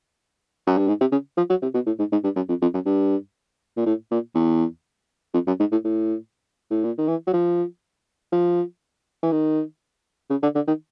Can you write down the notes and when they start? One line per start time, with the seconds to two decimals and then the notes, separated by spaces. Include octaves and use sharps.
0.67 F#2
0.78 G2
0.88 G#2
1.01 C3
1.12 C#3
1.37 F3
1.50 F#3
1.62 C3
1.74 B2
1.86 A2
1.99 G#2
2.12 G#2
2.24 G2
2.36 F#2
2.49 F2
2.62 F2
2.74 F#2
2.86 G2
3.77 A#2
3.86 A2
4.11 A#2
4.35 E2
5.34 F2
5.47 F#2
5.60 G#2
5.72 A2
5.85 A2
6.71 A2
6.84 A#2
6.98 D#3
7.08 E3
7.27 F#3
7.34 F3
8.32 F3
9.23 E3
9.32 D#3
10.30 C#3
10.43 D3
10.55 D3
10.68 D#3